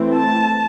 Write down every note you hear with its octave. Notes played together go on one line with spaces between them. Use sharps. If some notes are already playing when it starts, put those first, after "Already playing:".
Already playing: E3 A3 C4
A5